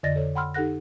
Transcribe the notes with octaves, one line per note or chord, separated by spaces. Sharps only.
F2 D3 D5 D#5 A6 A#6
A4 C#5
F#5 G5 B5 C6 E6 F6
D#4 G4 A4 F#5 F#6 A#6